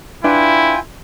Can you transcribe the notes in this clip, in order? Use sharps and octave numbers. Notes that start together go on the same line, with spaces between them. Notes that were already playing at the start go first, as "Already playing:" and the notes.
D4 E4 F4 B4 E5 G5 G#5